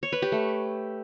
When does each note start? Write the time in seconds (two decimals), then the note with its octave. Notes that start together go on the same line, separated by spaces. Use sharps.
0.03 C#5
0.13 B4
0.22 G4
0.32 A3